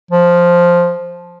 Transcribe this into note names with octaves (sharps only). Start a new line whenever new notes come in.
F3